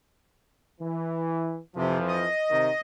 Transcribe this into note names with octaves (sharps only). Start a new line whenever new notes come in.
E3
F2 C3 E3 F3
D#5
C3 D#3